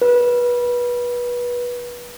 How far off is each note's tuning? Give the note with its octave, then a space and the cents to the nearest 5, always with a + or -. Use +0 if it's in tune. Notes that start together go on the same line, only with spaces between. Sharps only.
B4 -25